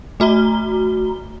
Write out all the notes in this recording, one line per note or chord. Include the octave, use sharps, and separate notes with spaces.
A3 F#4 A#5 G7